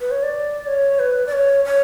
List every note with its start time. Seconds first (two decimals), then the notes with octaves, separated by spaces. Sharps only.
0.01 B4
0.11 C#5
0.23 D5
0.67 C#5
0.99 B4
1.27 D5
1.33 C#5
1.65 C#5